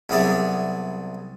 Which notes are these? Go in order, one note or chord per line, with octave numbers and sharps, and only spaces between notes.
C2 F#3 B3 G#4 D5 E5